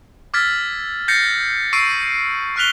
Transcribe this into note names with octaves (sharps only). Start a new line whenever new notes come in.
D6 E6 F6 G#6 A6 B6
G6 A6 A#6 C7 C#7
C#6 E6 C7 D7 D#7
C#6 F6 F#6 B6 F7 G7